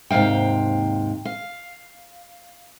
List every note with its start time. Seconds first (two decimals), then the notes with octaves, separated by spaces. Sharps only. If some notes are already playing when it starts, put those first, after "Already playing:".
0.10 D#2 G#2 C3 F5 G5
1.25 F5